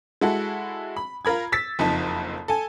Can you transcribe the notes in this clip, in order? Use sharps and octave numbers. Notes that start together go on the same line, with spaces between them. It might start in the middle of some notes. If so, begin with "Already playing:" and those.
G#3 E4 F#4 A4
B5
F4 A#4 B5 G#6
E6 A6 B6
F#1 F2 D#4 A5
A4 G#5